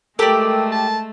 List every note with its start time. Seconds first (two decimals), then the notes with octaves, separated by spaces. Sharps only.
0.19 G#3 A3 G4 A4 A#4 D5 E6
0.72 A5